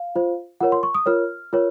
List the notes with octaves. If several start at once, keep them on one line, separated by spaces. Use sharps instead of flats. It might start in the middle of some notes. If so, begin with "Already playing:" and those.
Already playing: F5
F4 C5
F4 A#4 C#5 F#5
C6
C#6
D#6
F4 A#4 C#5 F6
F4 A#4 C#5